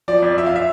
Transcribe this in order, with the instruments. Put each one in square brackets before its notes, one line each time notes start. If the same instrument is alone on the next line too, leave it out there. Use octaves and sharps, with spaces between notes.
[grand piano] F3 D5
F2
F3 E5
F5
E5